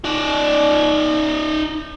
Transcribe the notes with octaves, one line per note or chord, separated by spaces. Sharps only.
D#4 D5